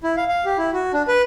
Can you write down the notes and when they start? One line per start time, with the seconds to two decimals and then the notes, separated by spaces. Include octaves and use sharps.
0.03 E4
0.17 F5
0.29 F5
0.45 G4
0.58 E4
0.73 F#4
0.93 D4
1.08 B4